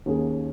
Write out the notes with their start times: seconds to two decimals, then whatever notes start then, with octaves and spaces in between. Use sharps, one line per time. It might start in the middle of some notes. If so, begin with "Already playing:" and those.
0.06 D#2 D#3 A#3 C#4 G#4